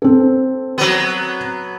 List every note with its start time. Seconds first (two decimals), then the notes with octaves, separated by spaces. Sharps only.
0.02 C4 A4
0.78 F#3 B3